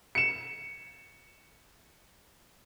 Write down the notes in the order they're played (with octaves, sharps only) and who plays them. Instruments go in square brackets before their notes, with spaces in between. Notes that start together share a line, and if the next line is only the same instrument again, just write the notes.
[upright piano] C#7 E7